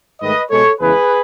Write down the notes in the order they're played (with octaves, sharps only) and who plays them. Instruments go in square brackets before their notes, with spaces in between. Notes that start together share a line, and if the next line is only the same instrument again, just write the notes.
[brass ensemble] G#2 D#3 A3 B4 D#5
B2 G#3 A4 C#5
E2 C#3 E3 G#3 G#4 B4